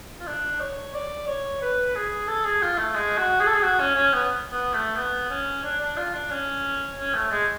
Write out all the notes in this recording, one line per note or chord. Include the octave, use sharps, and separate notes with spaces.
F4
D4
C#5
D5
C#5
B4
G#4
A4
G#4
F4
A3
G#3
F#4
G#4
A4
G#4
F#4
C#4
C#4
B3
B3
A3
B3
C#4
D4
D4
F4
D4
C#4
C#4
A3
G#3